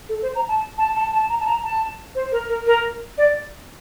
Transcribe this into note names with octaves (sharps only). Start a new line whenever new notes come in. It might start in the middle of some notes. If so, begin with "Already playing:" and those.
A4
C5
A#5
A5
A5
A5
A5
A#5
A5
A#5
A5
C5
A#4
A#4
A#4
D5